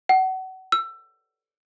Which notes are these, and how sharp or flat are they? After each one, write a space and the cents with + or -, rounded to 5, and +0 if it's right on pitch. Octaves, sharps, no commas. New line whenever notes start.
F#5 +30
E6 +25